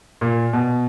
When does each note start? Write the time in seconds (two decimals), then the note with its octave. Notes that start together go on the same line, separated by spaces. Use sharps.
0.21 A#2
0.53 B2